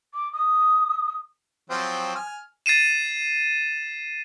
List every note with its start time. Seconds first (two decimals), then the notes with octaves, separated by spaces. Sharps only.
0.14 D6
0.32 D#6
1.70 F3 F#3 C4
2.15 G#5 F6
2.66 A6 C7 D#7 E7